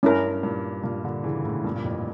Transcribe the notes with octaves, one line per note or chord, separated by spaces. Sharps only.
G2 C#4 E4 A#4
G2 A#2
G2 A#2
A#2 D3
C#3 E3
A2 C#3
G2 A#2
A#2
F2 A2